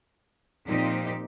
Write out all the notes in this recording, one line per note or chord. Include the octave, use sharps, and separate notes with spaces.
A#2 F3 C4 D#4 G4